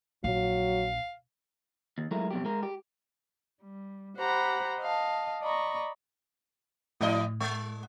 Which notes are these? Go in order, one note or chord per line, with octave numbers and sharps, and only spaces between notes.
A#1 F#3 F5
D#2
F#3 G#3 A3 E4 A#4
F2 B2 F#3 G4
G#3 A#4
G4
G3
G4 C5 F#5 A#5 B5
D#5 F5 A5
D5 D#5 A#5 B5 C#6
A2 F3 E4 D#5
G#3